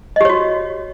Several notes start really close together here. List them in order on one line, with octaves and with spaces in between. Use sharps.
D#5 G4 C#5 F#4